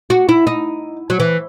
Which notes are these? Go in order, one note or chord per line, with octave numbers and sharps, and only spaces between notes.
F#4
E4
D#4
F#3
E3